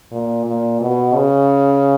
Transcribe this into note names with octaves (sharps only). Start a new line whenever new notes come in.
A#2
A#2
B2
C#3